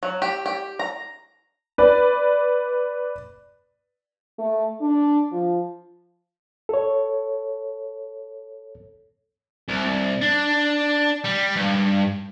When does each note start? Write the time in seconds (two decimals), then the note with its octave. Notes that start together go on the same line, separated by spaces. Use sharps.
0.03 F#3
0.22 G4
0.46 G4
0.79 A#5
1.78 B4 D5
4.39 A3
4.81 D4
5.32 F3
6.69 A4 C#5
9.68 C2
10.21 D4
11.25 G3
11.56 G2